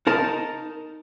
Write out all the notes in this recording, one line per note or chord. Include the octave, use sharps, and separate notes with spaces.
D#4 A#4 A5